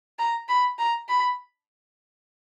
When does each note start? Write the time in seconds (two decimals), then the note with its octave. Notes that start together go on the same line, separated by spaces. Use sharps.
0.19 A#5
0.48 B5
0.78 A#5
1.08 B5